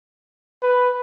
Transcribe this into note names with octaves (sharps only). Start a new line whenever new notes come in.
B4